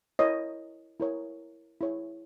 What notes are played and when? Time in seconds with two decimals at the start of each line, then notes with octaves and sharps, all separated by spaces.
0.19 E4 A#4 C#5 D#5
1.00 E4 A#4 C#5
1.81 E4 G#4 C#5